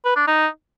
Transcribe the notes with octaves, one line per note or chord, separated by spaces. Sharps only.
B4
D4
D#4